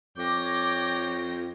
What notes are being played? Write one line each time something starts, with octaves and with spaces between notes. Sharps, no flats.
F2 C#5 G5 D6 A#6